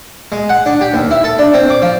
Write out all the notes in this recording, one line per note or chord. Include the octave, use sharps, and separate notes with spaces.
G#3
F#5
D4
G4
D#2
E4
A4
D4
C4
D6
F3